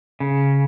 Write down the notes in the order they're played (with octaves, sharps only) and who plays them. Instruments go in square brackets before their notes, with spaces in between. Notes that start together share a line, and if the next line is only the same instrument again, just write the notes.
[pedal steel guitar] C#3